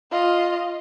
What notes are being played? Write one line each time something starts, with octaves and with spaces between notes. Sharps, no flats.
F4 D#5